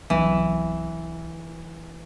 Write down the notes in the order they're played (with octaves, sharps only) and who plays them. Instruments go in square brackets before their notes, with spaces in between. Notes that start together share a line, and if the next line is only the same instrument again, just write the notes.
[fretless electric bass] C2 F#3 B3 [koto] E3